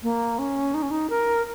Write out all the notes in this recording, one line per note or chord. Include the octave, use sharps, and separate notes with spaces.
A#3
C#4
D#4
C#4
D#4
A#4